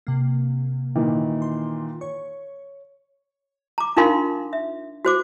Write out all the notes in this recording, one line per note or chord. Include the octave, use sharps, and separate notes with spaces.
C3 A#3
A#2 D#3 E3
C6
C#5 C#6
A#5 D6
D4 D#4 F4 A#4 F5 C6
E5
F#4 C5 D6